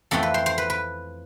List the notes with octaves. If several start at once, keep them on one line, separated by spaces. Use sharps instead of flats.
F2 E3 A3 C4 A4
B4
C5
C5
B4
B4